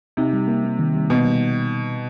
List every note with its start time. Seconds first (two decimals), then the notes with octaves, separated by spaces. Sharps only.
0.17 C3 D#4
0.33 G3
0.48 A#3
0.64 A#3
0.79 D#3
0.95 G3
1.10 B2 A#3
1.25 G3